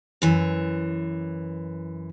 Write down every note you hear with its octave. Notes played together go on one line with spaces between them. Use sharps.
F#2 E3